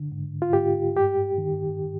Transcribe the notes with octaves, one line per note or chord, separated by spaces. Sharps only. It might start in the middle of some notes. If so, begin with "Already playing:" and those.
Already playing: D3
G#2
F4
G#2 G4
G2 G4
D#3